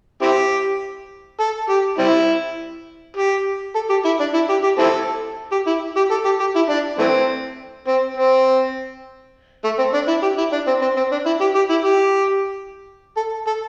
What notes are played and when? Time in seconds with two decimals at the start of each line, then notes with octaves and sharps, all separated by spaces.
0.22 C4 E4 G4
1.40 A4
1.69 G4
1.98 G3 C4 E4
3.17 G4
3.75 A4
3.90 G4
4.05 E4
4.20 D4
4.34 E4
4.49 G4
4.63 G4
4.78 C4 E4 A4
5.52 G4
5.67 E4
5.96 G4
6.11 A4
6.25 G4
6.40 G4
6.55 E4
6.69 D4
6.99 E3 A3 C4
7.87 C4
8.17 C4
9.64 A3
9.78 C4
9.94 D4
10.08 E4
10.23 G4
10.38 E4
10.53 D4
10.67 C4
10.82 C4
10.97 C4
11.12 D4
11.26 E4
11.41 G4
11.55 G4
11.70 E4
11.85 G4
13.17 A4
13.47 A4